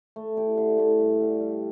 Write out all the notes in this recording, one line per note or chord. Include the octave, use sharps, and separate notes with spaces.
A3
E4 G4 D5
D3
A3 E4
G2
D3 G3
G3